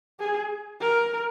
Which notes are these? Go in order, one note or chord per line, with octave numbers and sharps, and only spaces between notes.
G#4
A#4